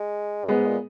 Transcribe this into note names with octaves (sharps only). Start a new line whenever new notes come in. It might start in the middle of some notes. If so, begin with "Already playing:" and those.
Already playing: G#3
F#2 G#3 B3
G#2
A#2